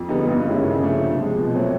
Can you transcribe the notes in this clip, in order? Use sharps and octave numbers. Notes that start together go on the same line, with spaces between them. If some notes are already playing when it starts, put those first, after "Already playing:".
Already playing: F2
D3 G3 B3 D#4
G2
D#3 G#3 C#4 E4
C#3
F3 A3 D4
C3
F3 G#3
B2
F#3 A3 C4